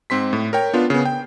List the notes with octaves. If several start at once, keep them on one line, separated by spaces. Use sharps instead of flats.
G#2 C4 C6 B6
A2
A#4 C#5 G5
B3 D4 F4
C#3 B3
G5